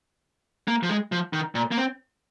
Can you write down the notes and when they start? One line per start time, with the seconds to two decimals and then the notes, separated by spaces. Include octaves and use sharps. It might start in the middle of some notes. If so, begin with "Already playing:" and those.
0.68 A#3
0.83 F3
0.89 G#3
1.12 F3
1.33 D#3
1.55 A#2
1.71 A#3
1.77 C4